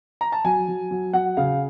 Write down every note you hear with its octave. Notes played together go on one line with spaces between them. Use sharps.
A#5
A5
F#3 G#5
F#3
F#3
F#3 F#5
C#3 F5